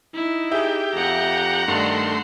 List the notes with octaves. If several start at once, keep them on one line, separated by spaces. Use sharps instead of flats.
D#4 E4
G4 G#4 E5
F2 F#5 A#5
G2 D#3 A3 D4 C6